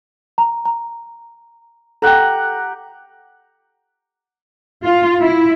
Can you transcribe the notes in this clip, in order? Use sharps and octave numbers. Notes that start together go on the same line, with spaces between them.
A#5
A#5
G4 A4 F#5 G5 A#5
F4
E4